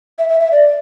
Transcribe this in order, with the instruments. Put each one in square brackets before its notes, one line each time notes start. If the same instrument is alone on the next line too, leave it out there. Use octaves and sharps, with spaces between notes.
[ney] E5
E5
E5
D5